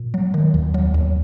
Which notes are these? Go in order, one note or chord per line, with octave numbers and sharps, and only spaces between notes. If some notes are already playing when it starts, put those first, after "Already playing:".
Already playing: A#2
F#3
D#3
D#2
F#3
D#2